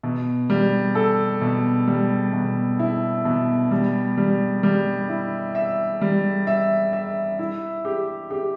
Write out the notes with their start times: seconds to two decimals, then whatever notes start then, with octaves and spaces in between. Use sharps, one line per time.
0.03 B2
0.50 G3
0.95 A4
1.41 B2
1.88 G3
2.33 B2
2.79 E4
3.25 B2
3.71 G3
4.18 G3
4.63 G3
5.09 E4
5.55 E5
6.01 G3
6.47 E5
6.93 E5
7.39 E4
7.85 G4
8.31 G4